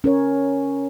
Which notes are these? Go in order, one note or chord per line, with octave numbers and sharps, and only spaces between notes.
C#4 A#4 C#5